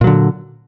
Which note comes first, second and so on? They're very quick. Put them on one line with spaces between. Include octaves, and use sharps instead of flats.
A#2 F#3 D3